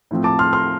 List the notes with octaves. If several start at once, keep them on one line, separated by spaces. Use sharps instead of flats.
A2 F3 C4
A5 D6
C6 F6
C6 F6